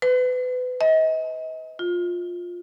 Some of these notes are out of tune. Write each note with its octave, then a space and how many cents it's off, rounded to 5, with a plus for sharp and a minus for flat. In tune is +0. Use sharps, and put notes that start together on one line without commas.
B4 +30
D#5 +35
F4 +15